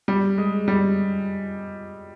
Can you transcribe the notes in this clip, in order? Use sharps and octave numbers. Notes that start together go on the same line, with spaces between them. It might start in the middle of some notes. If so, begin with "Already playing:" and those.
G3
G#3
G3